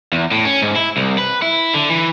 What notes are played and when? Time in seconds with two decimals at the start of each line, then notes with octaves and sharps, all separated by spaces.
0.13 E2
0.31 A2
0.45 C#4
0.62 G#2
0.76 E4
0.97 C2
1.18 B4
1.42 E4
1.74 D3
1.90 E3